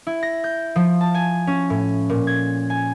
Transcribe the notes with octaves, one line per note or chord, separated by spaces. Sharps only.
E4
A#6
G6
F3
A5
G#5
C#4
A2
A#2
G#6
G#5